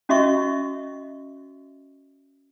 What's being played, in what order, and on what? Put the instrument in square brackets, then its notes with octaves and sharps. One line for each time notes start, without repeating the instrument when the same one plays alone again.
[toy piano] C#4 F#4 D#5 E5 C#6